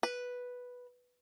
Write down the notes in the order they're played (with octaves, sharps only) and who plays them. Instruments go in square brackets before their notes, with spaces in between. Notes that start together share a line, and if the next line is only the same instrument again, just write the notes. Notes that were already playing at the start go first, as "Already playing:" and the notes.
[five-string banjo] B4